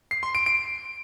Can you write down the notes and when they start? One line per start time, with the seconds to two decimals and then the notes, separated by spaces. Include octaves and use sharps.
0.11 C7
0.23 C6
0.35 D7
0.46 D7